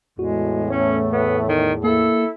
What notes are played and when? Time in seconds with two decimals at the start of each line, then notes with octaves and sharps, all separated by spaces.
0.19 E2 A2 G#3 F#4
0.70 A3 C#4 C#5
1.12 B3
1.48 D#3
1.84 A#3 E4 A4